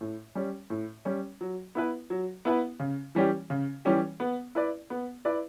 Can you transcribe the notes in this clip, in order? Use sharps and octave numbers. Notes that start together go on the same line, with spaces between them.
A2
G3 C#4
A2
G3 C#4
F#3
B3 E4 B4
F#3
B3 E4 B4
C#3
E3 G3 C#4 G4
C#3
E3 G3 C#4 G4
B3
E4 B4 D5
B3
E4 B4 D5